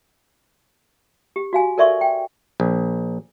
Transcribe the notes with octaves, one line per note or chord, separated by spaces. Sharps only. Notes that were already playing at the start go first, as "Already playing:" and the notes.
G4
F#4 F5 G#5
A4 A#4 D5 E5 C6 C#6
G5
A#1